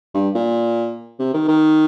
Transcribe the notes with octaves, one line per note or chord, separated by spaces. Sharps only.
G2
A#2
C3
D#3
D#3